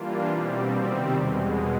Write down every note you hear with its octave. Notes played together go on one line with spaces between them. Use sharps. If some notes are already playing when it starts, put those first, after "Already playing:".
Already playing: E3 G3 A#3 D4 F4
B2 G3 C4
C3 D#3 G3 C4
E2 B2 G#3